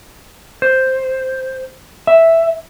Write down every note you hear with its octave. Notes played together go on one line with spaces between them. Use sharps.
C5
E5